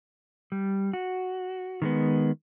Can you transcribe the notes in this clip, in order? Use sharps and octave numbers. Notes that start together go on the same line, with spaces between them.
G3
F#4
D#3 G#3 B3